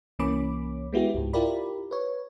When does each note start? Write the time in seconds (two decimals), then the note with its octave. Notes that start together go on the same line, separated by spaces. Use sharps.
0.19 C2 E3 A#3 C#4 B5 D6
0.93 G#3 B3 E4 F#4 G4
1.14 C#2 G#2
1.33 E4 F4 G4 A#4 D5 B5
1.91 B4 C#5